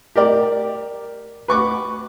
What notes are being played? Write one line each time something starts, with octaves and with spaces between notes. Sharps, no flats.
G4 A#4 D5
B4 C#6 D6